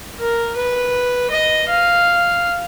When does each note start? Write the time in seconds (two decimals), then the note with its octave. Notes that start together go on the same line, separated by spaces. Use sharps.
0.19 A#4
0.56 B4
1.31 D#5
1.69 F5